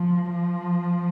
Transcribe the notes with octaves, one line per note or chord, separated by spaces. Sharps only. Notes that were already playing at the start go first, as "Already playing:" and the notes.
Already playing: F3
F3